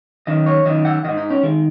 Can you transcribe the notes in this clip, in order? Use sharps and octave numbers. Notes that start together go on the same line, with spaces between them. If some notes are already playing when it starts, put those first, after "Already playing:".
F#2 D#3 D#5
C#5
F#2 D#3 D#5
F#5
G#2 D#3 D#5
D#4
C#4
D#3 G#3